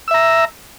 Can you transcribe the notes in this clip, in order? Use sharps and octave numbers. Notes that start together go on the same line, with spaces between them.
E5 A#5 E6